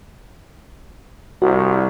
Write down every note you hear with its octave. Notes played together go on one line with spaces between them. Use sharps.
C2 F#4